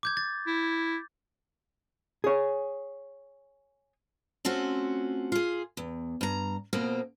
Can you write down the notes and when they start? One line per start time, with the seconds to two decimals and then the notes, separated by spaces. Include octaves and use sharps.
0.03 D6 G6 G#6
0.17 A6
0.47 E4
2.24 G#4 C#5
4.45 A3 C4 C#4 F4 F#4
5.32 F4 G#4
5.77 E2
6.21 G2 A#5
6.73 F2 B2 A#3 C4